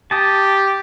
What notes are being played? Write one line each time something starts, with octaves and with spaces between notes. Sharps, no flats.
G4 A5 D#6